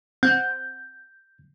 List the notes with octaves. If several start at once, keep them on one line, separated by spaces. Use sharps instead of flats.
C4 F#5 G6